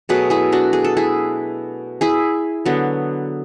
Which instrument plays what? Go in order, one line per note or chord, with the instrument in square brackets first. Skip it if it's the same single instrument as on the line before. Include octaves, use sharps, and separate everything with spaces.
[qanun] B2 F#3 A3 G#4 B4
E4 G#4
D4 F#4
G#4
A4
E4 G#4
E4 G#4
D3 F#3 B3